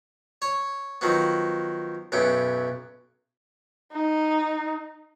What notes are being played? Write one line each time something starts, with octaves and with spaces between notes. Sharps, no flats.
C#5
D#3 F3 F#3 B3
B1 F#2 B3 G5
D#4